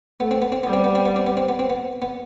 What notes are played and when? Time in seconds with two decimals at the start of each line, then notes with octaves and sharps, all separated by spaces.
0.20 A3 B3
0.31 C4
0.42 B3
0.52 C4
0.63 G3 B3
0.73 C4
0.84 B3
0.95 C4
1.06 B3
1.16 C4
1.27 B3
1.37 C4
1.49 B3
1.59 C4
1.70 B3
2.02 B3